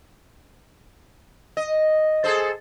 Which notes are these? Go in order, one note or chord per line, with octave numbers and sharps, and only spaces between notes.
D#5
G#4 A4 C5